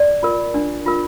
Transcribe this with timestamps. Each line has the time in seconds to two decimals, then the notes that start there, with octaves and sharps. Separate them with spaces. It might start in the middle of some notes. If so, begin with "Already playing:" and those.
Already playing: D5
0.23 F4 A#4
0.54 D4
0.86 F4 A#4